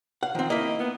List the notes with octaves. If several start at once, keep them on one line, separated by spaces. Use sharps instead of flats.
F5 F#5
D#3 F3 C4
A#3 E4 D#5 E5
B3